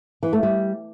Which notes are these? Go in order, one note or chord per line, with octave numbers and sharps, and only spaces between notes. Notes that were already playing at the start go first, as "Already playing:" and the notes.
E3
A3
G3